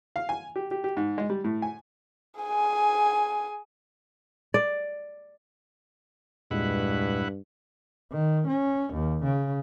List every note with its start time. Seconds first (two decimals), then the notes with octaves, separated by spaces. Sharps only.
0.16 F5
0.29 G#5
0.56 G4
0.71 G4
0.84 G4
0.97 G#2
1.18 G#3
1.30 G3
1.44 A2
1.62 G#5
2.40 G#4 G#5
4.54 D5
6.51 E2 G2 A#2 G#3 E4 B4 F#5
8.12 D#3
8.48 C#4
8.94 D#2
9.24 C#3